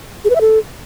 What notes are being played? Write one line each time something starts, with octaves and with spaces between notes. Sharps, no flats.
G#4
B4
E5
A4